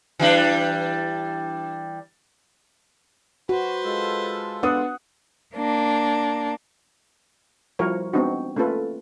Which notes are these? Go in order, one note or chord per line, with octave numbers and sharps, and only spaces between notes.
E3 G3 D4
F#4 B4 C5
G#3 F4 A4
B3 D4 F#5 D#6
A#3 D4
F3 G3 E4 F#4 A#4 C#5
G#3 B3 C4 D4 D#4 F#4
A3 A#3 C#4 F4 A4 B4